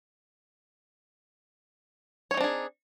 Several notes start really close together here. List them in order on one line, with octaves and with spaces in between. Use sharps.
C#5 D#4 C4 D4 G#4